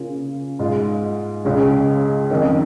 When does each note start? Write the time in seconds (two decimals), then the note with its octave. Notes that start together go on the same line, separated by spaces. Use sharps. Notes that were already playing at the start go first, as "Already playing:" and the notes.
Already playing: C#3 A#3 C#4 F4
0.59 G#2 G#3 F4
1.45 C#2 C#3 G#3 C#4
2.30 F2 D#3 C#4